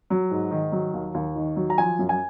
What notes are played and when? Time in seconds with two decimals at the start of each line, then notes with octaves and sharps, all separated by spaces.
0.10 F#3
0.31 G#2
0.51 D#3
0.72 F#3
0.94 D#2
1.14 D#2
1.35 D#3
1.56 F#3
1.70 A#5
1.78 F3 G#5
1.99 F#2
2.09 G#5